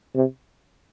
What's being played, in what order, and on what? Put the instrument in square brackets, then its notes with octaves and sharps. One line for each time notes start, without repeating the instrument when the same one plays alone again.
[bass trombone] C3